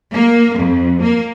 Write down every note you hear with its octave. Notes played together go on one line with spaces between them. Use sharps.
A#3
F2
A#3